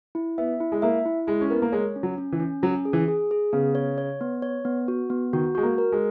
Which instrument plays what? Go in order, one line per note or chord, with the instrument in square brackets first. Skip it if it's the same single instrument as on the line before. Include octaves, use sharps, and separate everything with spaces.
[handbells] E4
[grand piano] B3 [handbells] E5
[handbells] E4
[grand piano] G#3
[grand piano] A#3 [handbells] E5
[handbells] E4
[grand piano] G#3 [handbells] E4
[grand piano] C#4
[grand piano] B3 [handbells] A#4
[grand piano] A#3
[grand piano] G#3 [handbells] C#5
[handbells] C#4
[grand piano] F#3
[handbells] C#4
[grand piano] E3
[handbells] C#4
[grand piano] F#3 [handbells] C#4
[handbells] G#4
[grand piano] E3
[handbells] G#4
G#4
[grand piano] C#3 [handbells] B3
[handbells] C#5
C#5
B3
C#5
B3
F#4
B3
[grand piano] D#3 [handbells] F#4
[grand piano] G#3 [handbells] F#4
[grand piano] A#3
[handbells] A#4
[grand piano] G#3